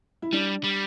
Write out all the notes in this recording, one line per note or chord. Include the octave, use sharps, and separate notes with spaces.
E4
G3 D4
G3